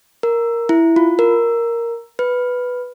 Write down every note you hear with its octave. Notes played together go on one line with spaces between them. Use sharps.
A#4
E4
F4
A#4
B4